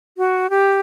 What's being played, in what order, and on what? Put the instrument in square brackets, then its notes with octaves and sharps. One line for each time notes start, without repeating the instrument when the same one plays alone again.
[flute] F#4
G4